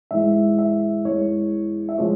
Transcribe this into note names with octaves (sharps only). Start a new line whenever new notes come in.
G#2 E3 G#3 E5
E5
E2 E3 G#3 C#5
E5
C3 F3 G#3 C#5